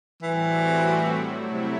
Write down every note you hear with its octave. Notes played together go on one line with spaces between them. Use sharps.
A2 E3 G3 C4 F#4
F#3 A3 E4
C3